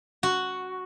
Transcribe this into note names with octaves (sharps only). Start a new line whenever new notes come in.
F#4